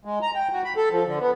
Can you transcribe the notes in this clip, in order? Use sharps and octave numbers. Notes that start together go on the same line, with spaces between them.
G#3
A#5
G5
F#4
B5
A4
F3
D3
B3